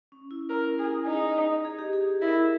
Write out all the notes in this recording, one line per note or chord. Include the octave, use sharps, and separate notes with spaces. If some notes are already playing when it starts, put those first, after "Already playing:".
C#4
E4
E4 A#4
G#4
D#4
G#4
G4
G#4
E4 A#4